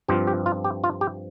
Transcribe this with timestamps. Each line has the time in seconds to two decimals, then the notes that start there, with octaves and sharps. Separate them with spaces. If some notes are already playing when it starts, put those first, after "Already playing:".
0.08 G2 F3 C4 F4 G4
0.27 G4
0.46 F4
0.64 G4
0.84 F4
1.01 G4